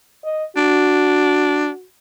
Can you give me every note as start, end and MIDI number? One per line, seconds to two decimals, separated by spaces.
0.24 0.44 75
0.56 1.68 62
0.56 1.85 66